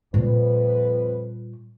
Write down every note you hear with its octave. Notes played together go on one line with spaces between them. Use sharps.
F2 A#2 G3 B4